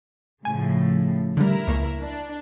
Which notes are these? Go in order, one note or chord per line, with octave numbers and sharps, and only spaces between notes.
A2 C#3 F3 G#5
D3 G3 E4 A#4
C#2 A#3 C#6
D4